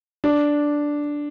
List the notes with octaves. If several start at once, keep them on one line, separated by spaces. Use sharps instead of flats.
D4